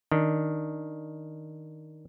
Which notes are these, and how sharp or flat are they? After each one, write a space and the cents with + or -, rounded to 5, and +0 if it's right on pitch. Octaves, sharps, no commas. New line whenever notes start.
D#3 +0 D4 +0